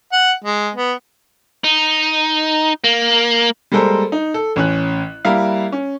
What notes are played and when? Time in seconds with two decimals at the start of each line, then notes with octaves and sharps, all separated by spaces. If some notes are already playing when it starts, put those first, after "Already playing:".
0.12 F#5
0.44 G#3
0.75 B3
1.64 D#4
2.84 A#3
3.72 G3 G#3 A#3 A4 A#4 C5
4.12 D#4
4.34 A4
4.56 A1 C#4 F#6
5.25 G3 A#3 E4 A#4 F5
5.72 C#4